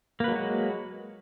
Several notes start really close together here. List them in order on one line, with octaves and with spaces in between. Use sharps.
A#3 B4 F#3 G#3 F#4